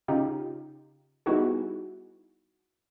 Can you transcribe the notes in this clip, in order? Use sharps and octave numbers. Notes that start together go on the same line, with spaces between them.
C#3 D#4 F4 G4
G3 B3 D#4 E4 F#4 G#4